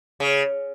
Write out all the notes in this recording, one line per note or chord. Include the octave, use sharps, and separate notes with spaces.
C#3